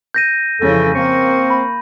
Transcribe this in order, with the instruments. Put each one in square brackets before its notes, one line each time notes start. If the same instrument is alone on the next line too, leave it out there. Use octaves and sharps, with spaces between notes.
[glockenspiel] G6 A#6 D#7
[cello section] F2 C#3 E3 [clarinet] A4
[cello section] A#3 [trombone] C4 [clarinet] C#6
[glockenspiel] B5